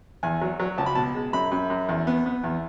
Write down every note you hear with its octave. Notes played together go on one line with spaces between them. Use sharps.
E2 G#5
F#3
F#3
C#2 A5
B5
B2 A5
G#3
F#2 B5
F#2
F#2
E2
B3
B3
E2